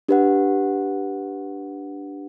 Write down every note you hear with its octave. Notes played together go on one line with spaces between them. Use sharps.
D4 G4 B4 F#5